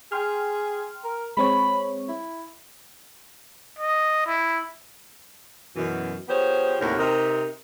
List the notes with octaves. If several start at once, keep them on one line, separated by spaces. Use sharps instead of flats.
G#4 G5 C6 F6
A#4
G#3 C4 C#5 B5
E4
D#5
E4
F#2 B2 E3
F3 B3 G4 G#4 C5 C#5
D#2 A2 C3 F#4 A#4 C#5
C3 D#4 A#4